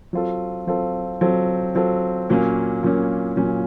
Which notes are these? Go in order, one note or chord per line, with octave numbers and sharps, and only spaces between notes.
F#3 C4 F4 A4
F#3 C4 F4 A4
F#3 C4 F4 A4
F#3 C4 F4 A4
A#2 F#3 A#3 C#4
A#2 F#3 A#3 C#4
A#2 F#3 A#3 C#4